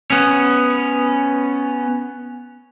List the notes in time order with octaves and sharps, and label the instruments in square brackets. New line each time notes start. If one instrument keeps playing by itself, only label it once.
[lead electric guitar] B3 C#4